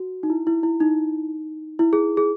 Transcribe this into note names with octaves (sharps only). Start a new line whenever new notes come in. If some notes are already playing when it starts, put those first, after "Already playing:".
Already playing: F#4
D#4
E4
E4
E4
D#4
E4
G#4
G#4